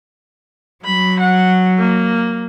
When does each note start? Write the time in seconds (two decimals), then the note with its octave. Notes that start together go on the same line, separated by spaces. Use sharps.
0.85 F#3 B5
1.20 F#5
1.79 A#3